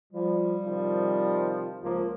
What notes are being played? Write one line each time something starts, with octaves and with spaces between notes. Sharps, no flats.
F3 G3
C3 D#3 F3
C#2 F3 A#3